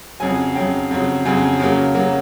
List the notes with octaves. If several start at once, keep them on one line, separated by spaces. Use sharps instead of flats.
F2 C#3 F#3 G#5
F2 C#3 F#3 G5
F2 C#3 F#3
F2 C#3 F#3 G#5
C#3 F#3 A#3
C#3 F#3 A#3